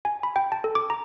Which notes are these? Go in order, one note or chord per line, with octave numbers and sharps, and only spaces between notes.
G#5
B5
G5
A5
A4
D6
A#5